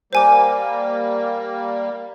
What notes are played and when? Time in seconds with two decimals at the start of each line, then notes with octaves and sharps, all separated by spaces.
0.13 G3 A#3 C5 G#5 D6